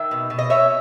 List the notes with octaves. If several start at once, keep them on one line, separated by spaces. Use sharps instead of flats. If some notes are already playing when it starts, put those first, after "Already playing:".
Already playing: D#3 E5
B2
B2
D#5
C#4 C#5 E5